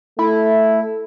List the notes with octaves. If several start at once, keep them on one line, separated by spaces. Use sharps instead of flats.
A3 E4